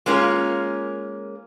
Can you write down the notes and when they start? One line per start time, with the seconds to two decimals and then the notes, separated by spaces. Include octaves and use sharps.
0.06 G#3 A#3 C#4 F4 A#4